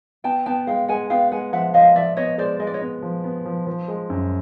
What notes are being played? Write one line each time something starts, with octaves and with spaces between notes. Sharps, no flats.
B3 G5 A5
B3 G5 A5
G#3 F5 G5
G#3 F#5 G#5
B3 F5 G5
G#3 F#5 G#5
F3 E5 F#5
F3 D#5 F5
F3 D5 E5
B3 C#5 D#5
G#3 C5 D5
G#3 D#5
D5
C#5 D#5
B3
F3
B3
F3
F3
G#3
F#2